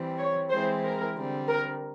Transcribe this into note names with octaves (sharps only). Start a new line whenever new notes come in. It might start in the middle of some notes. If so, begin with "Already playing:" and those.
Already playing: E3 G3 C4
C#5
E3 G#3 C4 E4 C5
A#4
D3 G3 C4
A#4